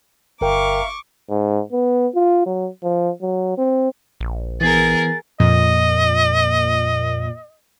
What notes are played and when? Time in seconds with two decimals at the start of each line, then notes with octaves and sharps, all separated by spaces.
0.41 G1 A#4 E5 F5 G5 A#5 C#6 D6
1.30 G#2
1.72 B3
2.15 F4
2.46 F#3
2.83 F3
3.22 F#3
3.58 C4
4.20 A#1
4.61 E3 B3 G#4 A#4 A6
5.40 F2 A#2 D#5